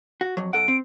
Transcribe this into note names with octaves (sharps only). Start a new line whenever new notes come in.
F#4
F2 F#3
B1 A4 F#5 D7
C4